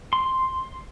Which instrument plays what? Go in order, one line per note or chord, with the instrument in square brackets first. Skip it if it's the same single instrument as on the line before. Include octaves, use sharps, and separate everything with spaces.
[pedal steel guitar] C6